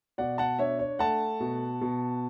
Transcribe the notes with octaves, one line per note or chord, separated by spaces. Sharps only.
B2 D5 F#5
F#5 A5
D4 C#5 E5
C#5
A3 F#5 A5
B2
B2